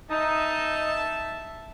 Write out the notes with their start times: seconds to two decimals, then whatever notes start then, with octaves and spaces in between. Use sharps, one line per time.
0.11 D#4 E5 A5